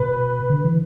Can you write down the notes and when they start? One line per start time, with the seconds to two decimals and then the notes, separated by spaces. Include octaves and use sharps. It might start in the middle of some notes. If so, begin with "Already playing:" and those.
Already playing: B2 B4
0.50 D3
0.64 E3